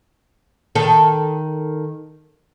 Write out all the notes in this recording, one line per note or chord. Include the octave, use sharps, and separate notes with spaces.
D#3 A4